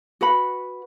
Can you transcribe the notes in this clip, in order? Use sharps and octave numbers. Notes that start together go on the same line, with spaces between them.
F#4 B4 F#5 B5